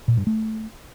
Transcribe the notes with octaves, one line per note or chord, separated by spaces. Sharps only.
A#2
G2
A3